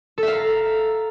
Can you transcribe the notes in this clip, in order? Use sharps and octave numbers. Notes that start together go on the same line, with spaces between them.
A4 E5 F5 A#5